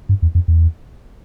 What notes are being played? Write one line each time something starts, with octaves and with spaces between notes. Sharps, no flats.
G2
E2
F2
E2